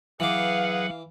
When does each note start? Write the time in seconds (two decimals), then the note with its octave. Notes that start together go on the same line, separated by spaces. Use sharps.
0.20 E3 F#3 G#4 B4 F5 F#5 D6